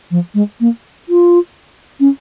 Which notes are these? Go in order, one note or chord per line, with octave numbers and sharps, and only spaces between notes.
F3
G#3
A#3
F4
C#4